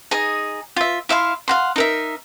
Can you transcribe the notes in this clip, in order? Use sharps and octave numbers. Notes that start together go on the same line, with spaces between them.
D#4 G#4 D#5
F4 E5
E4 E5 F5 C6
F5 F#5 C6
D#4 A#4 E5